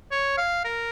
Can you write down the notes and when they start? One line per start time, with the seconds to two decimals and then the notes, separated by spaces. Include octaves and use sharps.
0.11 C#5
0.37 F5
0.65 A#4